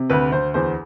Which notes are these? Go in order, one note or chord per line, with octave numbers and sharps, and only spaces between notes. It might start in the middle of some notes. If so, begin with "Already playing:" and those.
Already playing: C3
D2 B4
D2 C5
E2 C5